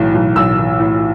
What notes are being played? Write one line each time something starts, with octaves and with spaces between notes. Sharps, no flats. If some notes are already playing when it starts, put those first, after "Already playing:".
Already playing: B1 A2 E3
B1
B1 E6
E3
A2